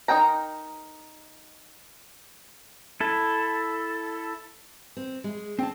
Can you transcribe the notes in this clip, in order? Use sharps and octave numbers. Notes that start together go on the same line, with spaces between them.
D#4 E4 A#4 G5 A#5
E4 A4
C4
G#3
C4 A5